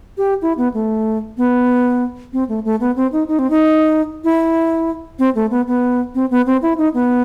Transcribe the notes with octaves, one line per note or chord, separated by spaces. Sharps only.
G4
E4
B3
A3
B3
C4
A3
A3
B3
C4
D#4
D#4
C4
D#4
E4
C4
A3
B3
B3
C4
B3
C4
E4
D#4
B3